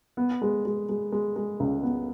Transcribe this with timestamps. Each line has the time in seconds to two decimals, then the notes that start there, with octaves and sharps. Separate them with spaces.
0.17 B3
0.42 G#3
0.65 G#3
0.89 G#3
1.12 G#3
1.36 G#3
1.60 C#2
1.83 B3